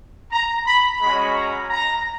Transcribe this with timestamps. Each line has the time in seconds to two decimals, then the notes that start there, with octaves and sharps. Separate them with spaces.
0.32 A#5
0.66 B5
1.00 G#3 C#4 F#4 B5
1.35 A#5
1.69 A#5